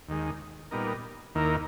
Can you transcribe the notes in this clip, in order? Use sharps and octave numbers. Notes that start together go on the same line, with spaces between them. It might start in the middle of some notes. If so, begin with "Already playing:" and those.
D#2 D#3 G#3
A#2 G3 B3 D#4 A#4
D#2 D#3 A#3 E4 A#4